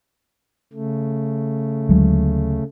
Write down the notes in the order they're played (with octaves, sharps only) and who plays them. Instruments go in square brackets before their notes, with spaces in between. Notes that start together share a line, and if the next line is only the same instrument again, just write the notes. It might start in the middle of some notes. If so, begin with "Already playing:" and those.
[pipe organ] C#3 A3
[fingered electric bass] D2 F#3 G#3